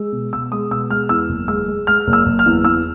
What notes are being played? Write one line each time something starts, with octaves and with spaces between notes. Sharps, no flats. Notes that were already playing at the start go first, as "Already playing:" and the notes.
Already playing: G#3 E6
B2
B2 E6
G#3 D#6
B2 E6
G#3 F6
E2 E6
F#1
G#3 E6
G#3
G#3 F6
F#1
E6
F#1
F6
E2
E2 E6